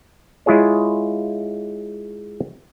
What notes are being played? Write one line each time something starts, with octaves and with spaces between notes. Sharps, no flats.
G#3 E4 F4 G#4 C#5